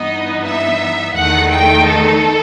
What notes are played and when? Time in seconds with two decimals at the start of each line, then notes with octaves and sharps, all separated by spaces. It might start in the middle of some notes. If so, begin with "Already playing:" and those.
Already playing: G2 E3 B3 D#4 D#5
0.44 E5
1.15 E2 D#3 A3 D#4 F#5
1.51 G5
1.86 A4